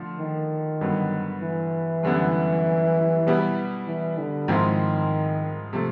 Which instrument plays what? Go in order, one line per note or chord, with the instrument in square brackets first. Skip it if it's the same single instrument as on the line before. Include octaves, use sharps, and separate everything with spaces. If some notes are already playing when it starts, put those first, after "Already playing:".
Already playing: [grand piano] D3 F3 A3
[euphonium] D#3
[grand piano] G2 D3 F#3 B3
[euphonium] E3
[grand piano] F#2 D3 G3 B3 E4
B2 G3 B3 E4
[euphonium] E3
D3
[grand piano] G#2 F3 G#3 C4 E4 [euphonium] D#3
[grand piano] C3 F3 A3